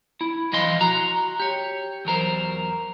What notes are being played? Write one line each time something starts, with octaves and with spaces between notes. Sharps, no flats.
E4
B1 E3 F3 D#5 F5 C6
F#4 A#5
G4 C#5
E2 F#3 A#4 C5